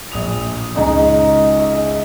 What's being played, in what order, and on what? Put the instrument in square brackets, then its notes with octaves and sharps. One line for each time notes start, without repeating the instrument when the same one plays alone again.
[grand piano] A#1 D#6 F7
[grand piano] C#2 C#3 G#3 [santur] D#4 D#6
[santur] E5